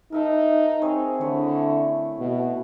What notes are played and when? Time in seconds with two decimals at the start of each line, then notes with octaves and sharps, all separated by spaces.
0.12 D#4 A#4 E5 A5
0.82 C4 G#4 C#5
1.21 D3 A3 E4 C#5
2.20 B2